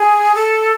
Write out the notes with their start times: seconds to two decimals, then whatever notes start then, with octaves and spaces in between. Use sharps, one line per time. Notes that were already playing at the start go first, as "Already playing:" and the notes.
Already playing: G#4
0.35 A4